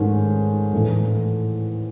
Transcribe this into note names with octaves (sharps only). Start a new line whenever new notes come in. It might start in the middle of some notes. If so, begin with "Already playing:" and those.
Already playing: G#2 D#3 A3 C#4
A2 E3 A3